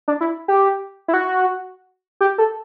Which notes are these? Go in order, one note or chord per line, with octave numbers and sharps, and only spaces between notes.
D4
E4
G4
E4
F#4
G4
A4